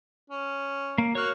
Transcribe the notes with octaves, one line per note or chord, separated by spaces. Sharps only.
C#4
A#3
A#3 F#4 C#5 F6